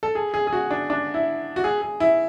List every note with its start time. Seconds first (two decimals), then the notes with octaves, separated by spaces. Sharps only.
0.03 A4
0.15 G#4
0.34 G#4
0.47 G#4
0.53 F#4
0.71 D4
0.90 D4
1.14 E4
1.56 F#4
1.64 G#4
1.82 G#4
2.00 E4